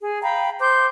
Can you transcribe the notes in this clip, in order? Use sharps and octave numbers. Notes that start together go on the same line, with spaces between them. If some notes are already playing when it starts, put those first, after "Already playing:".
G#4
F5 G5 A#5 B5
C5 C6 D6 G6